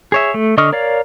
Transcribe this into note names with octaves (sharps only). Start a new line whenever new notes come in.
G#4 C#5 E5
A3
D3 D#5 C#6 D#6 F6
A#4 C#5 D5 F5